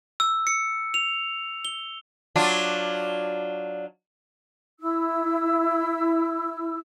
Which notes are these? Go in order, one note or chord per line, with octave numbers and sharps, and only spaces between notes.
E6
C#7
F7
G7
F#3 D4 F4
E4 E6